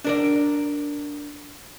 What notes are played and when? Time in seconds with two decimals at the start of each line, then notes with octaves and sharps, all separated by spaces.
0.04 D4 A#4 D5